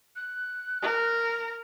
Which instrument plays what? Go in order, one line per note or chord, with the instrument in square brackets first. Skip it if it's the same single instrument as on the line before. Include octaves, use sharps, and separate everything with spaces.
[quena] F#6
[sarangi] A#4